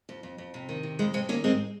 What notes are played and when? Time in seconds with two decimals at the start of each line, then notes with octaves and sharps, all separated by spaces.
0.09 F2
0.23 F2
0.38 F2
0.54 C3
0.69 D#3
0.83 C3
0.99 F2 G#3
1.13 F2 G#3 C4
1.29 D#3 A#3 C#4
1.44 G#2 G#3 C4